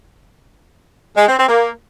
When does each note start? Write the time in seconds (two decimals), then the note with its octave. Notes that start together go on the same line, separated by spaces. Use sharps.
1.17 G#3
1.27 C4
1.38 C4
1.49 A#3